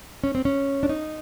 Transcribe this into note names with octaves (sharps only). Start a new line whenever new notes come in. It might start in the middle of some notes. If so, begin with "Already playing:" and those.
C#4
C4
C#4
D4
D#4